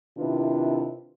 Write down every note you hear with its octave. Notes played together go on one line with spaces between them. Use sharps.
C3 D#3 D4 E4 F4 B4